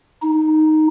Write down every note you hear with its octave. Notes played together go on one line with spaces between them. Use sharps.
D#4